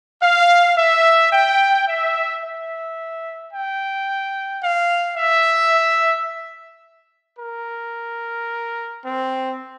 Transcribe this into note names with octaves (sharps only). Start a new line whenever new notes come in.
F5
E5
G5
E5
E5
G5
F5
E5
A#4
C4